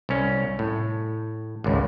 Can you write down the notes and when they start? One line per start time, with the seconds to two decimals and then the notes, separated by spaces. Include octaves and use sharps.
0.09 C2 C#4
0.59 A2
1.64 G#1 C#2